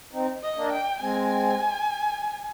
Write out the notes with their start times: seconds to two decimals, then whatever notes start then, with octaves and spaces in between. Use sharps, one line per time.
0.13 C4 D#4
0.43 D#5
0.56 A#3 D4
0.72 G5
1.00 G#3 C4 G#5